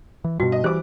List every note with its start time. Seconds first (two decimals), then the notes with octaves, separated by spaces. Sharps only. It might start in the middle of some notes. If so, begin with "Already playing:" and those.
0.24 E3
0.40 G2 B2 F#4
0.52 D#5
0.64 E3 G3 C5 D6